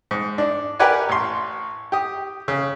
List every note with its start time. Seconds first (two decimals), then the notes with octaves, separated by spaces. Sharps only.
0.11 G#2
0.38 D4
0.79 G4 A#4 B4 D5 F#5 G#5
1.09 A1 C6
1.92 G4 D#6
2.48 C#3